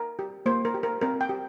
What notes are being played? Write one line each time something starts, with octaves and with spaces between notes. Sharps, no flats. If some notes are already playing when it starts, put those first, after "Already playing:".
Already playing: A#4
G4
A#3 C5
A#4
G4
A#4
C4 A#4
G5
G4